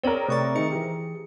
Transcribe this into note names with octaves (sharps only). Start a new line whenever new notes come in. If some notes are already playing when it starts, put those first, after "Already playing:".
C4 C#4 G#4 A#4 C#5 D5
C3 A3 D5 C#6 A6
D#3 D#4 G#4 C#7
E3 G4